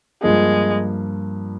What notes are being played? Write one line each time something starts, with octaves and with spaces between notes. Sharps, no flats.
G2 F3 G#3 A#3